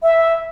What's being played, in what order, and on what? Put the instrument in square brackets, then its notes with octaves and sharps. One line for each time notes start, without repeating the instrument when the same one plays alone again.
[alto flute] E5